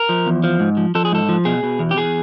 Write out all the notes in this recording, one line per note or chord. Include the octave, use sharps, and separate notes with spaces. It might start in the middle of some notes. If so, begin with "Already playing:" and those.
Already playing: A#4
F3
E2
F3
G#2
F3
F3 A4
G#4
G#2 A4
F3
B2 G#4
B2
E2
G4
E2 G#4